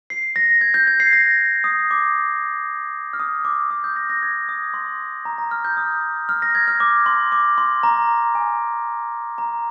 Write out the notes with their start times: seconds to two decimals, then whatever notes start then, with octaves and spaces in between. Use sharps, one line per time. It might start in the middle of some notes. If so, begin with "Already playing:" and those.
0.10 C7
0.36 A#6
0.61 G#6
0.74 G6
0.87 G#6
1.00 C7
1.13 A#6
1.64 D#6
1.91 D6
3.13 F6
3.20 D#6
3.45 D6
3.71 D#6
3.84 G6
3.96 A#6
4.10 A#6
4.23 G#6
4.49 D#6
4.74 C6
5.25 A#5
5.38 A#5
5.51 F6
5.65 G6
5.77 D#6
6.29 F6
6.42 A#6
6.55 G#6
6.68 F6
6.80 D6
7.06 C6
7.32 D6
7.58 C6
7.83 A#5
8.35 G#5
9.38 A#5